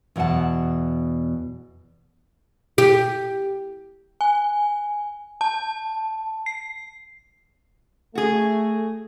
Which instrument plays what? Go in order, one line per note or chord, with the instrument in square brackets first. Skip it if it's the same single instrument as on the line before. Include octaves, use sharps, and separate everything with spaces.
[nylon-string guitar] E2 B2 F5 F#5 A5
[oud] G4
[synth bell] G#5
A5
C7
[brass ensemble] A3 [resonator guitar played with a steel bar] F#4 G#4